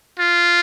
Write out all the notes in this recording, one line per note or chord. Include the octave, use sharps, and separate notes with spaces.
F4